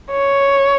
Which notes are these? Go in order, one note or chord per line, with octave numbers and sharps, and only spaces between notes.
C#5